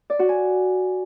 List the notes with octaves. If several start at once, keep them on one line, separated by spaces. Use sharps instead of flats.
D5
F#4
G#5